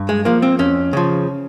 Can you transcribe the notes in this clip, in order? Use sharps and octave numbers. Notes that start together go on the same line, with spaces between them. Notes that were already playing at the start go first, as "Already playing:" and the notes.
Already playing: G2
G#3
F3 A#3
C4
F2 C#4
C#3 F3